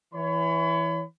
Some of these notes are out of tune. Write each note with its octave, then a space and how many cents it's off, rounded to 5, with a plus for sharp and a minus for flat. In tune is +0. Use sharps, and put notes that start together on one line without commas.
E3 +0 C#5 +25 B5 +35